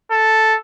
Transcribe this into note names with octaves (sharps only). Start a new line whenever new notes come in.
A4